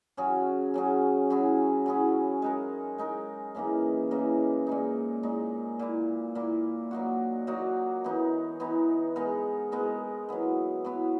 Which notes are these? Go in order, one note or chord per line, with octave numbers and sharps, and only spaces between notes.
C#3 F#3 C#4 G#4
C#3 F#3 C#4 G#4
F#3 C#4 E4 G#4
F#3 C#4 E4 G#4
G#3 D#4 A#4
G#3 D#4 A#4
C#3 E3 A#3 D#4
C#3 E3 A#3 D#4
A#2 G#3 D#4
A#2 G#3 D#4
A#2 A#3 E4
A#2 A#3 E4
F#3 A#3 D#4 F#4
F#3 A#3 D#4 F#4
E3 B3 D#4
E3 B3 D#4
G#3 B3 D#4 A#4
G#3 B3 D#4 A#4
F#3 B3 E4
F#3 B3 E4